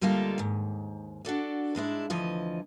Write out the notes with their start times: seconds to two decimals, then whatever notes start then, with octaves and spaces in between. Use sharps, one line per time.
0.01 D2 G3 G#3 A#3 F4 A4
0.38 D#2 G#2
1.25 D4 F#4 A4 D5
1.75 G#2 G#3 D4 E4
2.10 D2 E3 F3 D#5